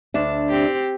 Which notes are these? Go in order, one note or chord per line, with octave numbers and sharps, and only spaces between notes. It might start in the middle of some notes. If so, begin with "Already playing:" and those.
D2 D4 E5
C4 G4